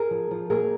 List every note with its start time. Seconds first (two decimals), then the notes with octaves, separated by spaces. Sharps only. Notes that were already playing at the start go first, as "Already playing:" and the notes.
Already playing: G#4 A#4
0.11 F3
0.31 F3
0.50 A#2 G#4 A#4